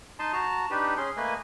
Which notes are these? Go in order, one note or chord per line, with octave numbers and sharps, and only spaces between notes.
D#4 D#5 A5 C6
F#4 A5 A#5
D4 D#4 G4 B4
C#4 G#4 C6
A3 A#3 B4 D#5 G#5